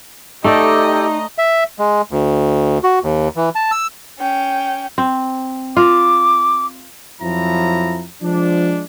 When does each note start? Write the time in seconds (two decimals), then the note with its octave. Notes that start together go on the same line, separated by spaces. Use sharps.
0.44 A3 D#4 G4 A4 D5 D#5 G5 A#5
1.38 E5
1.79 G#3
2.11 D2
2.84 F#4
3.03 D#2
3.36 E3
3.55 A5
3.72 E6
4.20 C#4 G5
4.98 C4
5.77 F4 D6
7.21 F2 F3 F#3 E4 A#5
8.23 F3 G#3 D4